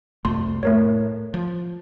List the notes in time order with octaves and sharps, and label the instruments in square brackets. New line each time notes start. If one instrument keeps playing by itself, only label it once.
[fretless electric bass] C2 F2 A3 [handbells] C6
[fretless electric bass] A2 [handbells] A3 A#4 C#5
[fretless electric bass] F3